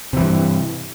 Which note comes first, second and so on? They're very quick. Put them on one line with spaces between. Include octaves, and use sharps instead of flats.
C3 E3 G2